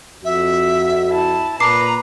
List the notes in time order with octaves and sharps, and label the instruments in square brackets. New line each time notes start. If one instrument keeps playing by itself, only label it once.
[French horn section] F2 F#4 [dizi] E5
[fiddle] E4 A5
[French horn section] A#2 [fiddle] B4 [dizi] A#5 [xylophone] D6 C7